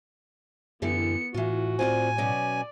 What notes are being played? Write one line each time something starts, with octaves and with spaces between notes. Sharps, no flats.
F#2 D3 E3 B3 G4 C#7
A2 E3 F4 F#4
C4 F4 D5 G#5
B2 F#3 C#4 D5